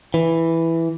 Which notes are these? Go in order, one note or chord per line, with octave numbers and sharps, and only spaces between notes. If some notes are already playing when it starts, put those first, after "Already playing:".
E3